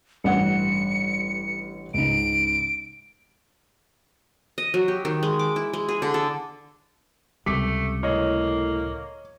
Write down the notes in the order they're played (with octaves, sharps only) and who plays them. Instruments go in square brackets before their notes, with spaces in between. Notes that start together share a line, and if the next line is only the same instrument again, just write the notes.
[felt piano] A1 G2 F#5 [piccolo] C#7
[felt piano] C#2 G#2 [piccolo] D7
[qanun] D#5
F#3
G4
D#3
G#3
D6
E4
G#3
G#4
D3
A4
[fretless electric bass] C#2 C3 G3 [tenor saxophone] A3 [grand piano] D6 B6
[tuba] A2 [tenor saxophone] A#3 [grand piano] C#5 D#5